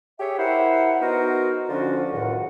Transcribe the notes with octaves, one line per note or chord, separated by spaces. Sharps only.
G4 G#4 C#5 E5
E4 A#4 C5 F#5
B3 D#4 F#4 A#4 C5
D3 F3 C#4 F4 F#4
C#2 F#2 A2 D#3 F#5